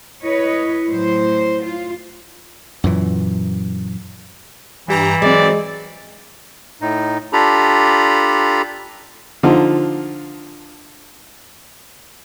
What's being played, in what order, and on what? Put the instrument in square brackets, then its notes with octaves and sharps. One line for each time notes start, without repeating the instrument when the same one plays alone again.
[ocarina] E4 [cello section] B4 C#5 D#5
[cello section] A2 F#3 C5
F4
[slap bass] F#2 A#2 E3
[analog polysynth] G2 G4 A#5 [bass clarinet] E3
[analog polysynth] F#3 C4 [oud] G#3 [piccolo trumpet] D5
[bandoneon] A2 D#4
D4 F4 G4 A4 A#5 B5
[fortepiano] D3 F3 D#4 F4